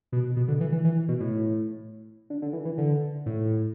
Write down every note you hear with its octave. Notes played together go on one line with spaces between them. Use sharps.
B2
B2
D3
E3
E3
E3
B2
A2
D3
D3
E3
E3
D3
A2